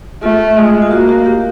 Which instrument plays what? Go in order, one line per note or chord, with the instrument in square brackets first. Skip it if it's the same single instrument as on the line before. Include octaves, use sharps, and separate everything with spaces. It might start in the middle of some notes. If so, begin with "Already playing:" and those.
[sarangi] A3 [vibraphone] F4
[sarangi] G#3
[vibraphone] F4
[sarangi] A#3 [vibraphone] F#4
[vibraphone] F#4
G4